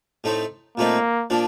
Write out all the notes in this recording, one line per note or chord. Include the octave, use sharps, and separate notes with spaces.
A2 A3 C4 D#4
A#2 F3 A3 A#3 C4 D#4
A#2 F3 A#3 D4